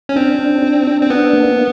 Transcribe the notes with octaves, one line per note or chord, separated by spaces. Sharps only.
C#4
C4 D4
D4
D4
D4
C4
B3 D4
A#3